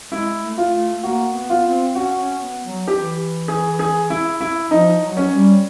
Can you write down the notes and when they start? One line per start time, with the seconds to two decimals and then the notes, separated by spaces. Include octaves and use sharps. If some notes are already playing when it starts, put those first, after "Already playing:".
0.12 G#3 E4
0.42 A3
0.58 F4
0.73 A3
1.03 A#3 F#4
1.34 B3
1.50 F4
1.65 C4
1.95 C#4 F#4
2.19 C#4
2.41 B3
2.65 F#3
2.88 E3 G4
3.48 G#4
3.79 G#4
4.10 E4
4.41 E4
4.71 F3 D#4
5.01 F#3
5.17 C#4
5.32 G3